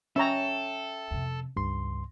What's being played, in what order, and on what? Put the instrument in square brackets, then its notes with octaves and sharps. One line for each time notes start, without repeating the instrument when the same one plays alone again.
[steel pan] C#4 C#5 A#5 [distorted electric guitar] A4 [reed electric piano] E5 G5
[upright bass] F2 C3
[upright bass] C#2 [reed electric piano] G2 C6